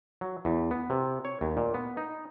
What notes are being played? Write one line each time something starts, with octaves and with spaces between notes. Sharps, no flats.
F#3
E2
B3
C3
C#5
D#2
A#2
B3
D#4